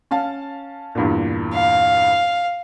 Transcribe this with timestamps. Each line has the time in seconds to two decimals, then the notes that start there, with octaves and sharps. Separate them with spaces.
0.11 C#4 F5 A5
0.95 E2 G2 A#2
1.54 F5